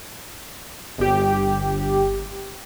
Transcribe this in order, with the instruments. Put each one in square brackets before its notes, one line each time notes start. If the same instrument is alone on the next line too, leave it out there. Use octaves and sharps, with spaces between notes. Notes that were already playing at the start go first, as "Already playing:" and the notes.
[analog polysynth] G1 G4